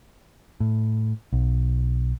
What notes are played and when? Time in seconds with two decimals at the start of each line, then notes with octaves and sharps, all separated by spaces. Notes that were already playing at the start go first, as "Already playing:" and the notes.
0.60 A2
1.33 B1